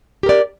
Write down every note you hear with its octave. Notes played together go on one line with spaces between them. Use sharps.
G4 A#4 D5